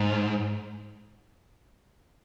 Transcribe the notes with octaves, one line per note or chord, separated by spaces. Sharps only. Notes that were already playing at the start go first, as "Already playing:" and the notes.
Already playing: G#2